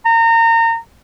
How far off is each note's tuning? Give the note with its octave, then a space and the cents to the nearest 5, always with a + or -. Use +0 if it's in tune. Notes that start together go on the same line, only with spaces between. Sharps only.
A#5 -30